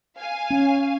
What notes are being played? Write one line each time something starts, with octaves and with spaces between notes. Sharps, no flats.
F5 G#5
C#4